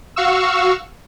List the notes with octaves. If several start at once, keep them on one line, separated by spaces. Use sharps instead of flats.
F#4 F5 C#6 E6